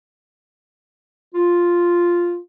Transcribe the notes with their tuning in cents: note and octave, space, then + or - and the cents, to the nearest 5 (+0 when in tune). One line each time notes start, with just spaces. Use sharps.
F4 +0